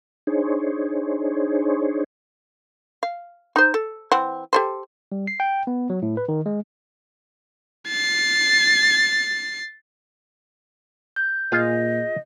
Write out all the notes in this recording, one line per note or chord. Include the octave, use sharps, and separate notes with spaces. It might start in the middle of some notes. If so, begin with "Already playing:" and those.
D4 D#4 G#4 C5 C#5
F5
D#4 C5
A4
E3 C4 F#5
G4 A4 C5
G3
C7
G5
B3
F#3
A2
B4
D#3
G#3
A6 C7
G6
A#2 F4 G#4 D#5 F5